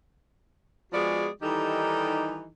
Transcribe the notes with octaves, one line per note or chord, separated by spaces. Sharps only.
F3 G#3 B3 F#4 G#4 D5
D#3 E3 G3 D#4 G4 A4